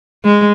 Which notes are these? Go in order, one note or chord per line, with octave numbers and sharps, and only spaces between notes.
G#3